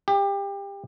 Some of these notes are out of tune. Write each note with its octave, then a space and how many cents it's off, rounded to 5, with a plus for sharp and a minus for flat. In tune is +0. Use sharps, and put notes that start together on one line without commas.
G4 +25